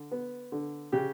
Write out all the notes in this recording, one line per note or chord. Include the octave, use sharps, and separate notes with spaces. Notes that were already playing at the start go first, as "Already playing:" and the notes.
Already playing: D3
B3
D3
C#3 G4